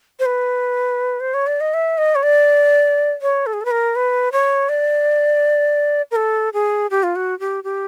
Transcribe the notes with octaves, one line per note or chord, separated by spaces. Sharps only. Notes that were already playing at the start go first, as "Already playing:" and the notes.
C5
B4
C5
C#5
D5
D#5
E5
D#5
C#5
D5
C#5
A4
G#4
A4
B4
A#4
B4
C#5
D5
A#4
A4
G#4
G4
F4
F#4
G4
G4